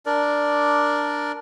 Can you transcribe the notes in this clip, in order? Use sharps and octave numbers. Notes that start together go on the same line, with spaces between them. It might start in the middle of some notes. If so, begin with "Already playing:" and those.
D4 A#4 D5